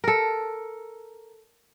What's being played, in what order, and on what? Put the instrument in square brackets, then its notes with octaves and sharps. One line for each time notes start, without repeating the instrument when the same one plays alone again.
[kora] A4 A#4